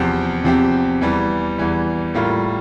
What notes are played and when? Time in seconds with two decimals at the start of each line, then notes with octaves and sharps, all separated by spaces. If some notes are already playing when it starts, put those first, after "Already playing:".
Already playing: E2 C3 F3 C4 G4
0.44 E2 C3 F3 C4 G4
1.01 E2 E3 G3
1.58 E2 E3 G3
2.14 A2 G3 A#3 F4